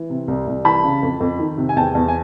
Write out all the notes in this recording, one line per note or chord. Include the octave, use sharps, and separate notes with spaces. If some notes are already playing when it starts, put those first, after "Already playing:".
Already playing: E3
C3
C2
C2
E3 A5 B5
C#3
F2
F2
D#3
C3
G#5
E2 G5 A5
E2
G#5